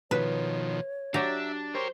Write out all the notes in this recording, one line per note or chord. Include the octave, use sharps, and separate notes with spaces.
B2 D#3 F3 B4 C#5
F#3 D4 G4 E5 A#5
G4 A#4 C5 C#5